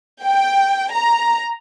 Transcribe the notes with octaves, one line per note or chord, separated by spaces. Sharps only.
G5
A#5